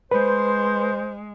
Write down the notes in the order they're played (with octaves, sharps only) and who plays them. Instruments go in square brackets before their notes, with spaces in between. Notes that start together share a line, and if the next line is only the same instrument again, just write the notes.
[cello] G#3 [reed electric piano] B4 [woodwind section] C5